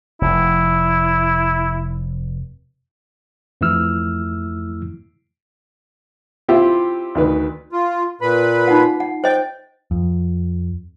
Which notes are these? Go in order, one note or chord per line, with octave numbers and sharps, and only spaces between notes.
F1 E4
F2 E3 A3 E4 E6 F6
C4 E4 F4 G4 E5
D2 D#3 B4
F4
A#2 B4 B5
D#4 F4 F#5
F#5
C5 D#5 G5
F2